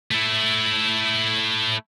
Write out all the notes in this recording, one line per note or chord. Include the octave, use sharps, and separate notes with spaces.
A3 E4